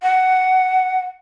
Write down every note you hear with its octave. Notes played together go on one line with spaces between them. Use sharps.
F#5